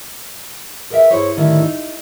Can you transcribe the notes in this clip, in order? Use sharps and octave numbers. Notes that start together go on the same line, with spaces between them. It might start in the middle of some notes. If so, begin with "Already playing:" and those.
G#4 A#4 B4 D5 E5
G2 E4 G#4 C5 C#5
A2 D3 D#3 G3 E4
D#4